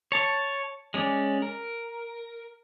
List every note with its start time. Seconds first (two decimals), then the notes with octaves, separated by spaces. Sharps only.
0.12 C#5 A5
0.94 G#3 C#4 D5
1.42 A#4